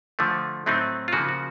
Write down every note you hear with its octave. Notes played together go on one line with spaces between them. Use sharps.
D3 F3 A3
A2 F#3 A3 C4 D#4
F4
C#3 F3 A#3 F#4
F#4